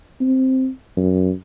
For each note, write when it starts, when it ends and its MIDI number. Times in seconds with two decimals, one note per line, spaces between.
0.21 0.69 60
0.97 1.32 42